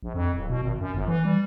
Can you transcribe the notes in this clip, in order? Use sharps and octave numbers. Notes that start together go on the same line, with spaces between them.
A#1
F2
D1
B2
G#1
F#2
G1
E3
G3